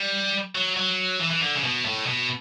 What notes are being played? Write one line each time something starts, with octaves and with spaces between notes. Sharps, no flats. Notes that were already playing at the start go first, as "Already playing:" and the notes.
Already playing: G3
F#3
F#3
E3
E3
D3
C#3
B2
A2
B2